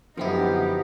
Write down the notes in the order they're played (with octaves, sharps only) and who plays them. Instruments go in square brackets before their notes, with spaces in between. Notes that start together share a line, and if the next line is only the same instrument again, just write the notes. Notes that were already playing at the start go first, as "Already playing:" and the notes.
[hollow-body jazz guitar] F#2 F3 [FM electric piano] D3 C4 E4 [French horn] B3 [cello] D#4 G4